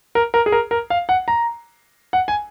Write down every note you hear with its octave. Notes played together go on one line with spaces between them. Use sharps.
A#4
A#4
G#4
A#4
A#4
F5
F#5
A#5
F#5
G#5